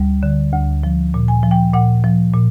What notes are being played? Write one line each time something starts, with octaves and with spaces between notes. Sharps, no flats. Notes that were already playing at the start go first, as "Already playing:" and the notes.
Already playing: D2 G3
D3
D2
F3
A#2
G#5
F3
G5
A#2 F#5
F3
A#2